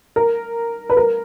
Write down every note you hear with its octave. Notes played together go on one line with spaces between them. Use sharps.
A#4
B4
A#4